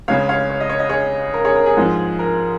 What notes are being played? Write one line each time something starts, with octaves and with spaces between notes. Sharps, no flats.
C#2 C#3 G#3 C#5 F5
C#5 F5
C#5
D#5
C#5
D#5
G#4 C#5
A#4
G#4 C#5
A#4
G#4
G#2 F3 G#3
A#4